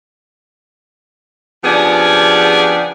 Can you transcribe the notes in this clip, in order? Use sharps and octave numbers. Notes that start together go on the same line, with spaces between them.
C#3 F3 B3 D4 G4 G#4